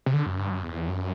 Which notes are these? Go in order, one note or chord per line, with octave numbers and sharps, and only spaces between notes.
C3
D3
F#2
G2
F#2
E2
F#2